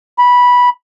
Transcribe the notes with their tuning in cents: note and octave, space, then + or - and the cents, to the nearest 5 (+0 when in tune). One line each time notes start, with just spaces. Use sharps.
B5 -10